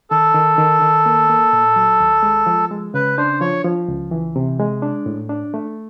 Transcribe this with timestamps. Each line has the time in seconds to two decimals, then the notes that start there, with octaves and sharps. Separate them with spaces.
0.10 D#3 A4
0.34 D#3
0.58 D#3
0.82 D#3
1.06 A#3
1.29 A#3
1.53 A#2
1.76 F#3
2.00 D#2
2.23 G#3
2.46 F3
2.71 G#3
2.94 C#3 B4
3.17 D4 C5
3.41 F3 C#5
3.64 F3
3.88 C#2
4.11 E3
4.36 C3
4.60 G#3
4.82 D4
5.06 A2
5.29 D4
5.54 A3